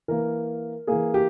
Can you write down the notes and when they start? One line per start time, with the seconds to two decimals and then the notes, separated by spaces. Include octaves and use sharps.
0.08 E3 A#3 A#4
0.87 E3 A#3 G#4
1.14 G4